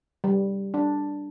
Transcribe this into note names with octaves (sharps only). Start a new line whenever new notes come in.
G3
D4